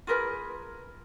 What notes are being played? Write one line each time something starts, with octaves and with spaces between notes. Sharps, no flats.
F4 G#4 A#4 B4